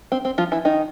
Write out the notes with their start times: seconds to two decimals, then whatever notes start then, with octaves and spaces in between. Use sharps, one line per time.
0.12 C4
0.25 C4
0.38 F3 F4
0.52 E3 E4
0.65 D#3 D#4